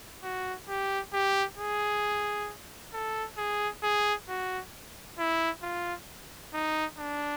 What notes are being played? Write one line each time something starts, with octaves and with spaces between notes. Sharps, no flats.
F#4
G4
G4
G#4
A4
G#4
G#4
F#4
E4
F4
D#4
D4